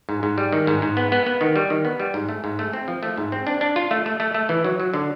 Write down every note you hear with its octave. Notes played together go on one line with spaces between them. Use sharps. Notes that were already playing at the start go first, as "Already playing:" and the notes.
G#2
G#2
G3
D#3
G#2
G#2
B3
B3
B3
D#3
G3
D#3
B3
G3
G#2
A3
G#2
A3
C4
F3
A3
G#2
C4
D4
D4
F4
A3
A3
A3
A3
E3
F#3
F#3
D3